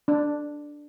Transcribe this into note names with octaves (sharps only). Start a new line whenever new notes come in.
D4